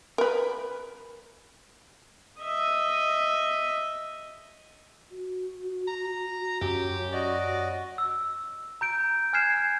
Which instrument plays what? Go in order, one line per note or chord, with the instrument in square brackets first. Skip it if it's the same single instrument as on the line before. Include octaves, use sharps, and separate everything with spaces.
[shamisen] A#4 B4
[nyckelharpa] D#5 E5
[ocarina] F#4
[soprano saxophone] A#5
[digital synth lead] F#2 [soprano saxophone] G4
[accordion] F#4 D#5 [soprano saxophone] D5
[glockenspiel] E6
A#5 G6 D7
G#5 F6 F#6 G#6 C7 E7